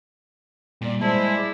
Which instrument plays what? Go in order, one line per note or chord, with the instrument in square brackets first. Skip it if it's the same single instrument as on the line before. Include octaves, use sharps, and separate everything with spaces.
[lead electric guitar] A#2 [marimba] G3 A#3 D5
[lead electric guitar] G#3 [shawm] E4 [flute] C5 [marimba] A5
[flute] D5